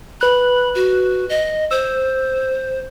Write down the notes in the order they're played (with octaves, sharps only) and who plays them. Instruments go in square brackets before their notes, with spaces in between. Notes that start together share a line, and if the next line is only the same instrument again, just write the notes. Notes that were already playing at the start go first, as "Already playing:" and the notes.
[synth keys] B4 F#6 [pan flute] B5
[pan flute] F#4
D#5
[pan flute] C5 [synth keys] E6